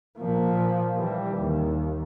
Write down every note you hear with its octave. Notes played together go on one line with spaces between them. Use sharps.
A#2 F3
E3 G3
D#2